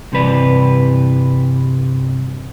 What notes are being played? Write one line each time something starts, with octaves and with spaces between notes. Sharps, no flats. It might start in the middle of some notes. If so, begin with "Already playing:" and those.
G2 C3 E3 B4 D5